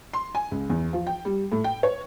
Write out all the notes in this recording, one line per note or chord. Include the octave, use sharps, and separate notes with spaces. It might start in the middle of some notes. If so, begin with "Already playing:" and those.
C6
G#5
C#2
E2
F3
G5
G3
A2
G5
C#5